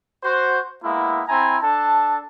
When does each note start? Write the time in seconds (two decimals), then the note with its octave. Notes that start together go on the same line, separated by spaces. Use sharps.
0.23 F#4 C5
0.83 G#3 A#3 B3 E4
1.28 C4 E4 G#5 A#5 B5
1.62 D4 A4 A5